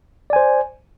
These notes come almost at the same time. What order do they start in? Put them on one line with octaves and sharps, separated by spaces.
D5 G#5 C5